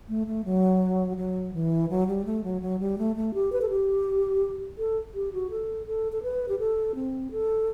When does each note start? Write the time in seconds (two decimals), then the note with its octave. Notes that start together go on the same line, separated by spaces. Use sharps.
0.09 A3
0.27 A3
0.45 F#3
1.17 F#3
1.54 E3
1.89 F#3
2.07 G3
2.25 A3
2.44 F#3
2.62 F#3
2.80 G3
2.98 A3
3.16 A3
3.34 G4
3.52 B4
3.62 A4
3.70 G4
4.78 A4
5.15 G4
5.33 F#4
5.50 A4
5.87 A4
6.12 A4
6.23 B4
6.49 G4
6.59 A4
6.95 C4
7.32 A4